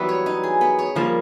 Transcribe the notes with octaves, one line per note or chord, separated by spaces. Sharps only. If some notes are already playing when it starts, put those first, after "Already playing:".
Already playing: E3 F#3 G3 B3 D#4
C#5
D#4
G#4
B3
C#5
F3 G3 A#3